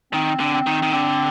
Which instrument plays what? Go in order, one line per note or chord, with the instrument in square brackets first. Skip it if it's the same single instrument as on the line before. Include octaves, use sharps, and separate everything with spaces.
[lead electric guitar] D#3 [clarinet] C4
[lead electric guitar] D3
[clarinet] C4
[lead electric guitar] D#3
D#3
[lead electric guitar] D3 [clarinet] C4